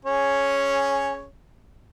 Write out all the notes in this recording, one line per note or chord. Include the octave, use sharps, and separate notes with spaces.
C#4 G#4 C#5